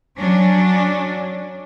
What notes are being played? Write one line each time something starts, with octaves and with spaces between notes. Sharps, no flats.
F#3 C#4 D4